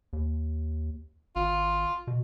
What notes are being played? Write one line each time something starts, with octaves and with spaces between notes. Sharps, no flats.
D#2
G#1 F4
B2